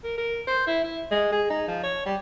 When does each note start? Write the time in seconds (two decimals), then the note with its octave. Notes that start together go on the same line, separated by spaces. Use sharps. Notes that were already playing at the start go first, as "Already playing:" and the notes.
0.04 A#4
0.18 A#4
0.47 C5
0.67 E4
0.84 E4
1.11 G#3
1.32 G#4
1.50 D#4
1.68 F3
1.84 C#5
2.06 G3